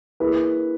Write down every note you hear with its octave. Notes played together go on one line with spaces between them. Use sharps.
A#3 E4 G#4 B4